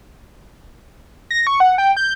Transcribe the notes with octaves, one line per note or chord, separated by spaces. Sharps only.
A#6
C#6
F#5
G5
G6